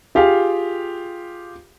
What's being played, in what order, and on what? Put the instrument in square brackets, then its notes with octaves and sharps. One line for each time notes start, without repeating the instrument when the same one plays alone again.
[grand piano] F4 G4 G#4 F5